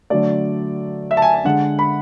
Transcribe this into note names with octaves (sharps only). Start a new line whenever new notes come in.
D3 F#3 A3 D5
E5
A5
G#5
G#5
D3 G#3 F#5
B5